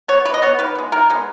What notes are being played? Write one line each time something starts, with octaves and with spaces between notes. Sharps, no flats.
B3 C#5
E3 B4
D#5
B3 C#5
D#3 B4
G#3 B3
D#3 A#4
G#3 B3